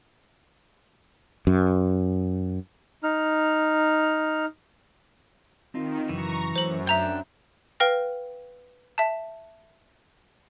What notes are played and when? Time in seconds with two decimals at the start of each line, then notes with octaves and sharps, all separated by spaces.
1.47 F#2
3.03 D#4 F6
5.74 D#3 C4 D#4 F4
6.09 F#2 C#3 E3 F#3 A#5 C#6
6.56 F#2 F#3 A3 C5 F#7
6.87 D4 E5 G5 A#5 G6
7.80 B4 F5 G5 F6 A#6
8.98 E5 A5